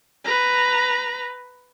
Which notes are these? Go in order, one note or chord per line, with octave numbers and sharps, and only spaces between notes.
B4 A#5